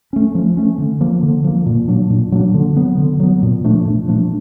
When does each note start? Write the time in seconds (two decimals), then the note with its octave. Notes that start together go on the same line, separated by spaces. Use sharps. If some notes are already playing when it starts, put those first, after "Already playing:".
0.13 A3 C#4
0.35 F3
0.57 A3 C#4
0.78 D3
1.01 F3 A#3
1.23 D3
1.44 F3 A#3
1.66 A#2
1.88 F#3 A#3 D4
2.10 A#2
2.32 F#3 A#3 D4
2.54 D3
2.76 F#3 B3
2.98 D3
3.20 F#3 B3
3.43 A#2
3.64 F3 A3 D4
3.86 A#2
4.08 F3 A3 D4